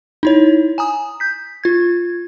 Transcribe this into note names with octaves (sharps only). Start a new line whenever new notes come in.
D#4 E4 C#5
G#5 A#5 D#6
G6 B6
F4 G#6